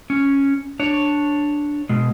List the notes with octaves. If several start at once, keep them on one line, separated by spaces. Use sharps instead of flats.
C#4
D4 C#5
B2 G#3